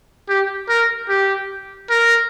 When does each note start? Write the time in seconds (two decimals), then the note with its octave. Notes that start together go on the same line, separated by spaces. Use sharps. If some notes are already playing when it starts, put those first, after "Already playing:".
0.29 G4
0.69 A#4
1.09 G4
1.90 A#4